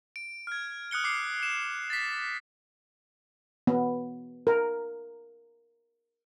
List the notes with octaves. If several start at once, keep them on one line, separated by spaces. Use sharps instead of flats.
D7
F6 G#6
D#6 F#6 C#7 G7
D6 C7 C#7
E7
A6 B6
B3
A#4